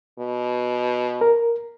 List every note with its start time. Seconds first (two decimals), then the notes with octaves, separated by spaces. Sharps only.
0.19 B2
1.21 A#4